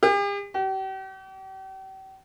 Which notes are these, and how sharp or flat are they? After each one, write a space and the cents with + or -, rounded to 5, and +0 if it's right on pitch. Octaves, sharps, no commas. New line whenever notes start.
G4 +45
G4 -40